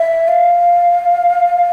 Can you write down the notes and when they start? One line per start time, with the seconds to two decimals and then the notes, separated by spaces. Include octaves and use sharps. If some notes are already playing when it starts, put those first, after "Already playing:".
Already playing: E5
0.28 F5